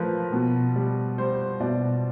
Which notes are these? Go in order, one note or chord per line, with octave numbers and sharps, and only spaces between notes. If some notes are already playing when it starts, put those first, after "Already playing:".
Already playing: F3 A3 A#4 B4
B2
G3
G3 C5
B2 D5